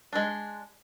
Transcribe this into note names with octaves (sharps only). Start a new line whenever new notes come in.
G#3 D4